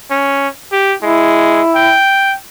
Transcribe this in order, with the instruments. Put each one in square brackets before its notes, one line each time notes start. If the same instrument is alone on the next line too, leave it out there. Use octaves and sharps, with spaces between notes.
[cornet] C#4
G4
[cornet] G#3 [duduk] E4
[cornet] G5